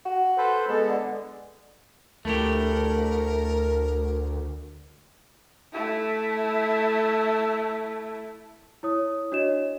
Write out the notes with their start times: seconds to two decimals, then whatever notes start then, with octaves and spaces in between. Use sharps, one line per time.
0.06 F#4
0.38 A4 B4 C5
0.69 G#3 B3 A4
0.89 D3
2.25 D2 A3 E4 G4 A#4
5.73 A3 E4
8.83 E4 C#5 D#6
9.32 D4 F#4 C#5 D#5 E7